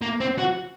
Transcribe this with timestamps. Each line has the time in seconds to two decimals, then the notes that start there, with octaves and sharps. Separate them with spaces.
0.02 A#3
0.20 C4
0.38 F#4